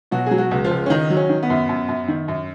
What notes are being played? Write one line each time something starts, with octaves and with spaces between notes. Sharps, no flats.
B2 F#3 F#4
F#3 G#4
F#3 F#4
C#2
F3 F4
C#2
C#4
D#3 D#4
F#3
C#4
D#3
B3
F#2
F#2
F#2
D#3
F#2